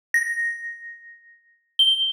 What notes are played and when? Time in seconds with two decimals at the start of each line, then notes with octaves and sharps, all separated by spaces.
0.14 A#6
1.79 G7